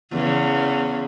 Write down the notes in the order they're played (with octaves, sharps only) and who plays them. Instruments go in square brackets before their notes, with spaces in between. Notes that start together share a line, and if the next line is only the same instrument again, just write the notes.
[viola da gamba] E2 C#3